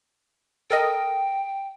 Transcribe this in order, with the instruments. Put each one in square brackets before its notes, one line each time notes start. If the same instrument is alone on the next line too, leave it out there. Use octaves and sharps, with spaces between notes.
[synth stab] A4 A#4 D#5 [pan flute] G5